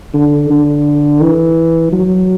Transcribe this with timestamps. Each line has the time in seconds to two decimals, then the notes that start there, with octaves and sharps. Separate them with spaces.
0.14 D3
0.50 D3
1.22 E3
1.92 F#3